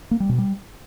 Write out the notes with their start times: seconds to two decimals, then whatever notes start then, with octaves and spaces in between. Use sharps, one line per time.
0.11 A#3
0.20 G3
0.29 B2
0.38 G3